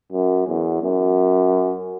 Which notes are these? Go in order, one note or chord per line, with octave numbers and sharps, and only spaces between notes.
F#2
E2
F#2